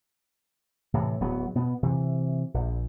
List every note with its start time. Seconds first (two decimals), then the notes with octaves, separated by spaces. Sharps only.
0.94 A2 C3 E3
1.21 D1 F#3 B3
1.55 B2 B3
1.83 C3 E3
2.54 A#1